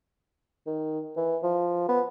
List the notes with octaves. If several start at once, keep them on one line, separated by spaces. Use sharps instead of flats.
D#3
E3
F3
B3